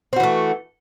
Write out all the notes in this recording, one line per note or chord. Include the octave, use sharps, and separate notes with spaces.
E3 A3 C4 F#4